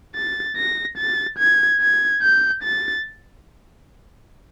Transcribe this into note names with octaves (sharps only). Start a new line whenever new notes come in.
A6
A#6
A6
G#6
G#6
G6
A6